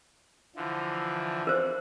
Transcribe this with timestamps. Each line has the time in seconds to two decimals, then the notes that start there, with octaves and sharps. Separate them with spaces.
0.56 D3 E3 F3
1.47 A#4 C5